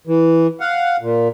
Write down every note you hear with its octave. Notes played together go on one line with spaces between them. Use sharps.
E3
F5 F#5
A#2